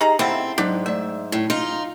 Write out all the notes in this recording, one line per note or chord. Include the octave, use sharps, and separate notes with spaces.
D#4 G4 G#4 A#5
C#3 C4 E4 A4 C5 E5 F#5
G#2 F#3 D4
A3 D5 E5
A2
D#4 F4 D#5